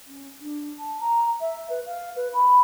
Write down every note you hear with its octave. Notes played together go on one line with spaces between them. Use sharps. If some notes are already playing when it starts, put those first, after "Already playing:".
C#4
D4
A5
A#5
E5
B4
F5
B4
B5